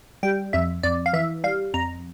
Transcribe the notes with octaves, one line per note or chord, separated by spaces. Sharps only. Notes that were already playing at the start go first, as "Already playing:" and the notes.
G3 G5
F2 E5
F2 D5
F5
E3 E5
G3 F5
F2 A#5